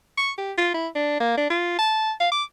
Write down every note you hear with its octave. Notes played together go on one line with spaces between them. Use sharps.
C#6
G4
F4
E4
D4
A#3
D4
F4
A5
F5
D6